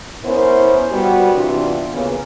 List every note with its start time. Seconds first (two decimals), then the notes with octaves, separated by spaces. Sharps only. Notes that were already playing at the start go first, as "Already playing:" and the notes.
0.25 B3 C#4 E4 A#4 C5
0.91 G3 B3 F#4
1.33 C3 E3 B3 D4 F4
1.93 C#3 A#3 B3